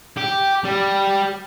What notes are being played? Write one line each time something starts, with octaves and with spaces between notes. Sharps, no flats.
G4
G3